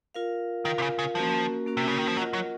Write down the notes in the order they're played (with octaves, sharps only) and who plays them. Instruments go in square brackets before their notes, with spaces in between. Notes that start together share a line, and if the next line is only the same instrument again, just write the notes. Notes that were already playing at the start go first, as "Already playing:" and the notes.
[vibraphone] F4 A#4 F5
[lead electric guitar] D#3 [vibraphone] F4 A#4 F5
[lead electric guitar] C3
C#3
C#3
[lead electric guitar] F3 [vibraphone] A#3 C#4 F#4 A#4
[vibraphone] A#3 C#4 F#4 A#4
[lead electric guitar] C3
C#3
D#3
F3
[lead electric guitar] F#3 [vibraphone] F4 A#4 D#5 F#5
[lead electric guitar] F#3